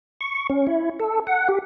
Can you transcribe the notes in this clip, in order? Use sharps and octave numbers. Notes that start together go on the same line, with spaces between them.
C#6
C#4
E4
A4
F#5
G4